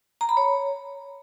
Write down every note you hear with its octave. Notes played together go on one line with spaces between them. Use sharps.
A#5
B5
C#5